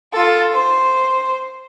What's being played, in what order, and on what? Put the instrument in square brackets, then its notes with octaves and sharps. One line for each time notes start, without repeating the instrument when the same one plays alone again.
[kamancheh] F4 A4
C5